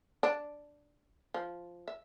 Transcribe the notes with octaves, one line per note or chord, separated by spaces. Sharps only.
D4
F3
E5